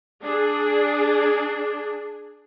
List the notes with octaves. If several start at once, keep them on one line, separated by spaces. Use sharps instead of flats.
D4 G#4